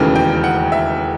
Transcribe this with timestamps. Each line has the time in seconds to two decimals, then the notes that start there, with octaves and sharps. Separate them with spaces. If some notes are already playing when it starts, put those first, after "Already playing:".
Already playing: E1 D#2 C#3 E3 A3
0.16 G5
0.44 F#5
0.72 E5